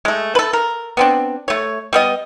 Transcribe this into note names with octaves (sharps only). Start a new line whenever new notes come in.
G#3 A3
A4 B4
A#4
B3 C4 D4
A3 C#5
G3 B3 D#5